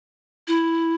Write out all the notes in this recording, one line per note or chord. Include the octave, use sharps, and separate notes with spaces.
E4